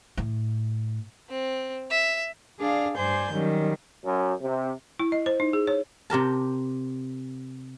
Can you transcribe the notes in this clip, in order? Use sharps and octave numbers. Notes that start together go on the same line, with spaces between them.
A2
C4
E5
D4 G#4 D5 F5
G2 C5 D5 G#5 G6
D#3 F#3 G3 C#4
F#2
C3
E4
D#5
C5
D#4
G#4
C#5
C3 G4 A#4 A5